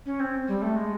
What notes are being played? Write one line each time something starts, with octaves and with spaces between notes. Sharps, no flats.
C#4
C4
G3
A3
G#3